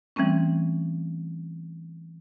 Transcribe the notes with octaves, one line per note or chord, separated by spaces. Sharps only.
E3 G3 A3 C4 C#4